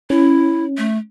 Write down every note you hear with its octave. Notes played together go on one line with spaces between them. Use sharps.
C#4 E4
A3